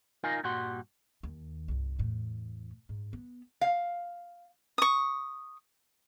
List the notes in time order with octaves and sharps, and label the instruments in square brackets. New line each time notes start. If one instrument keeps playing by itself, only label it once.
[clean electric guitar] D#4 F4 A#4 D#5 F5 G#5
G2 A#2 G3 F#4 F#5 C6
[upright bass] D#2
G1 C2
E2 A2
G#2
B3
[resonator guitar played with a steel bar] F5
[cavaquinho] C#6 D#6